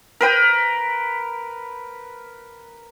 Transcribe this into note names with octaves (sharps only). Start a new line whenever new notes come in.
A#4 B4 G5